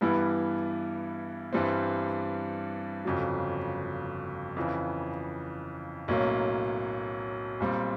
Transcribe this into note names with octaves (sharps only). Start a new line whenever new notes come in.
G2 E3 G3 B3 E4
G2 E3 G3 C4
G1 F2 C#3 F#3
F2 C#3 E3
B1 A2 F#3 A#3 C#4
B1 A#2 G3 C4